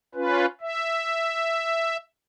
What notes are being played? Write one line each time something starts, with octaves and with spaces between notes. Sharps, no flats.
C#4 F4 B4
E5